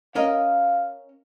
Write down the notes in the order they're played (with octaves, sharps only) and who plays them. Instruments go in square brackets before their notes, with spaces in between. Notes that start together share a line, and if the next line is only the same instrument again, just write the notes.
[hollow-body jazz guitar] C#4 A#4 D#5 [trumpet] F5